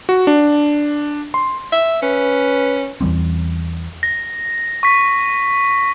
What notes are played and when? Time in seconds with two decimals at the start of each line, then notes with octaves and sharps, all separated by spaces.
0.09 F#4
0.27 D4
1.34 C6
1.72 E5
2.02 C#4 B4
3.01 E2 E3 G3 C4
4.03 A#6
4.83 C#6 B6